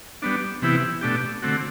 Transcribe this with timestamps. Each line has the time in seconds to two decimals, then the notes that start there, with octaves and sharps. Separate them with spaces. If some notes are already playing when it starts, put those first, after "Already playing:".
0.22 G3 B3 D4
0.62 C3 E3 B3 E4 G4
1.01 B2 A3 D4 G4
1.42 D3 A3 C4 F#4